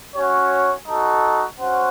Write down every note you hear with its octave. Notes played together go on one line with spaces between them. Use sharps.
C#4 F#4 C#5
D#4 F#4 A4
C#4 F#4 C5 F#5